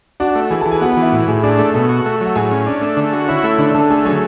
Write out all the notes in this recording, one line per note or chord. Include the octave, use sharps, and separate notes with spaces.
D4 F#4 F#5
A3
E3 G#4 G#5
A4 A5
E3
G#4 G#5
B3 F#4 F#5
F#4 F#5
E3
E4 E5
A2
A2 G#4 G#5
D4 G#4 G#5
A3
B2 A4 A5
F#4
A3
F#3 F#5
A2 G#4 G#5
C#4
D4
A3
D3
F#4
C#4 E4 C#5
A3
D3 D4 D5
D3 A4 A5
A3 G#4 G#5
F#3 G#4 G#5